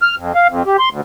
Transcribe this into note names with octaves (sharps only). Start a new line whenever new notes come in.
F6
F2
F5
F2
G4
C6
D2